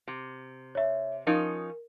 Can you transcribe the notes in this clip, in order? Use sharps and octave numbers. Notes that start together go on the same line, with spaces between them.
C3
C#5 E5
F3 C#4 D#4 A#4